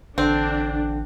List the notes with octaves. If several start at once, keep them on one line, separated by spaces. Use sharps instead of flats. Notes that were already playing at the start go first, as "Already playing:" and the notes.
A1 D3 C4 D4